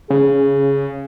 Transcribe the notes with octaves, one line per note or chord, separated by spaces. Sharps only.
C#3 G#4